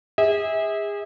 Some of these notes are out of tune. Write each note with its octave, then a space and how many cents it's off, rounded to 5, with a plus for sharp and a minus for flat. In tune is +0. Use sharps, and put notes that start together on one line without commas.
G#4 -30 E5 -35